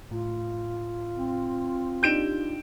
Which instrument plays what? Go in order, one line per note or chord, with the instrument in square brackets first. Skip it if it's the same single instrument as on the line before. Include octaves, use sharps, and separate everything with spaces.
[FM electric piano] A2 [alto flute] F4
[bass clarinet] C4
[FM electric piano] D4 D#4 G4 [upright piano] G6 D7 E7